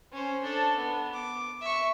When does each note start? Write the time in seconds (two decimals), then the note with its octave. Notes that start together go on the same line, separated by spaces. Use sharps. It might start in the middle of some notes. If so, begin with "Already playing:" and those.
0.13 C#4 C5
0.43 D4 A4
0.77 B3
1.13 D6
1.61 E5 C#6